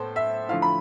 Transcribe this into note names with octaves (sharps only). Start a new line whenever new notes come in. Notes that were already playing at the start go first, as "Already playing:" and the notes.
Already playing: A2 B3 A4 C5
E5
D3 F3 A3 E4 F5
B5